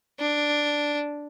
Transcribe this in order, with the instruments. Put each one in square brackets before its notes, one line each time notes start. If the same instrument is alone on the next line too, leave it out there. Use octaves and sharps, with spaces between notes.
[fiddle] D4